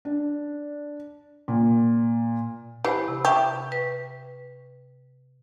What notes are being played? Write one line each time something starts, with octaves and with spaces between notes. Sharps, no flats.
D4
A#2
E3 G4 C5 B5
C3
G4 E5 C#6
B4